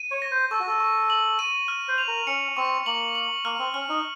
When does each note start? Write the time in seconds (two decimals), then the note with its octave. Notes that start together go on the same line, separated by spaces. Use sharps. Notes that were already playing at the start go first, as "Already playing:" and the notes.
Already playing: D#7
0.11 C#5
0.22 A#6
0.31 C5
0.51 A4 C#6
0.60 F#4
0.67 A4
0.80 C#6
1.10 F#7
1.39 D#7
1.68 F6
1.88 C5
1.98 F7
2.08 A#4
2.27 C#4 C#7
2.57 C4 C#6
2.86 A#3 F#7
3.15 F#7
3.45 A#3 F6
3.59 C4
3.74 C#4 F6
3.89 D#4